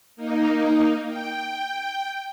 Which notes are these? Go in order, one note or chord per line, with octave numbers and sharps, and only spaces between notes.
A#3 D#4
G5